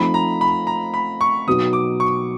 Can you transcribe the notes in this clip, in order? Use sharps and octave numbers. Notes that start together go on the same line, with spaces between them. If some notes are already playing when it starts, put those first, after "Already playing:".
Already playing: F3 A3 C4 D#4 B5
A#5
B5
A#5
B5
C#6
B2 F#3 B3 D#4 D#6
D6
C#6